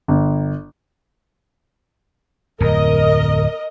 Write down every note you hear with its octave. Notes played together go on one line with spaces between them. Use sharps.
G1
D1 F2 A#4 D#5